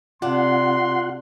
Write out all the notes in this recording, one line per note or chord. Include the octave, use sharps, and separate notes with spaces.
C3 D4 F4 F#5 C6